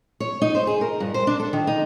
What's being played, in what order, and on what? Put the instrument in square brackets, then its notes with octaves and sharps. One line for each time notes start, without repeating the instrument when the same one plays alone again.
[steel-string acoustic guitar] C#5
D#4
C5
G#4
A#4
G2
C5
D4
A4
D#3
D#4